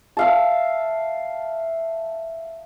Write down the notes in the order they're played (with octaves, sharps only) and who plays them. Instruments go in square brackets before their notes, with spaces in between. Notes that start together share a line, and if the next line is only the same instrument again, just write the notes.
[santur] E5 F5 A5